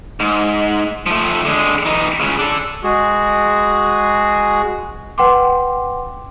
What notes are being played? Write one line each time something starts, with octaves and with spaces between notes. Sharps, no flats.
G#2
F3 A3
D3 G#3
E3 D#4
C#2 C#3
D4 A4
G#3 F#4 G#4
B4 F#5 G5 C6 D6